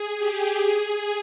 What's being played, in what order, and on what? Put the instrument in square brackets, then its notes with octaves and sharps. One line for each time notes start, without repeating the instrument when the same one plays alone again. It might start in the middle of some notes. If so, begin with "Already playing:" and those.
Already playing: [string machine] G#4
G4
G#4